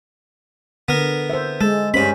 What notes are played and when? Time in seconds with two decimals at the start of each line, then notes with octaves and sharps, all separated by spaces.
0.88 D3 B3 A#4
1.30 C5 E5
1.61 G#3 A4
1.94 G2 C#4 C5 B5